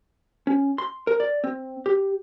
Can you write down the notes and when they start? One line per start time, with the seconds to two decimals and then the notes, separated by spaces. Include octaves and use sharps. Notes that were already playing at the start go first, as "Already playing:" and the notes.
0.47 C#4
0.78 C6
1.07 A#4
1.20 D5
1.44 C4
1.86 G4